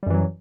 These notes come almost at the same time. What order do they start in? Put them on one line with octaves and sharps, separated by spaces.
G3 F#2 E3 F#3